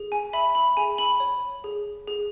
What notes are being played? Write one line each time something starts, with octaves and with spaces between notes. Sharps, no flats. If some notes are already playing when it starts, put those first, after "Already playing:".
Already playing: G#4
G#5
E5 B5
B5
G#4 G#5
B5
C#5
G#4
G#4